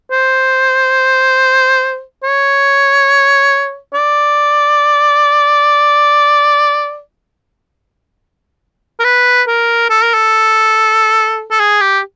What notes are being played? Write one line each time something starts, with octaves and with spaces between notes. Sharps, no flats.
C5
C#5
D5
A#4
B4
A#4
A4
A#4
A4
A4
G#4
G4